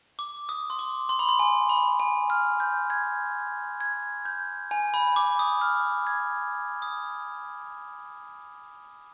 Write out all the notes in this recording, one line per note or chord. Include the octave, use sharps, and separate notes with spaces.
D6
D#6
C6
D6
C6
B5
C6
G#5
B5
G#5
F6
G6
G#6
G#6
G6
G#5
B5
D6
D#6
F6
G#6
D#6